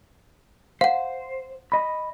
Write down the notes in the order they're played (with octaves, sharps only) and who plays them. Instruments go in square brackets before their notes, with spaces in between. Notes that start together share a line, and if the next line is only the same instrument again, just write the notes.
[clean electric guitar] C5 [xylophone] F5 F#5
[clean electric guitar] D#5 B5